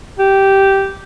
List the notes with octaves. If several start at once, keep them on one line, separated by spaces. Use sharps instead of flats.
G4